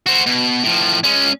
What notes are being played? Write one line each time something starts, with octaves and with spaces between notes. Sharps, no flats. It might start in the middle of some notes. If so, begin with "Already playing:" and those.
F#4 C5
B2
A2 F3
G#3 C#4